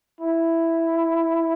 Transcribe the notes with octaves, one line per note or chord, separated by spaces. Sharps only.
E4